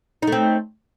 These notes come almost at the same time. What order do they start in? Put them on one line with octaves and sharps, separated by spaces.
D#4 A3 C4